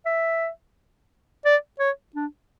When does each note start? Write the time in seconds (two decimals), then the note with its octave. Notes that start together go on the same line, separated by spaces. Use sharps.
0.06 E5
1.45 D5
1.80 C#5
2.15 D4